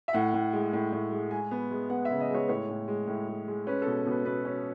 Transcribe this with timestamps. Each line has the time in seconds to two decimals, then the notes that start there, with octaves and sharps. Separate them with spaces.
0.08 E5
0.13 A2 F#5
0.34 A2
0.53 G#3
0.73 A2
0.93 A2
1.11 G#3
1.31 G#3 G#5
1.51 B3
1.71 G#3
1.90 B3 F#5
2.05 E5
2.10 C#3
2.20 D#5
2.30 G#3 C#5
2.49 A2 C#5
2.69 A2
2.88 G#3
3.07 A2
3.28 G#3
3.48 G#3
3.67 C#4 B4
3.82 B2 A4
4.06 B2 B4
4.26 B2 B4
4.45 C#4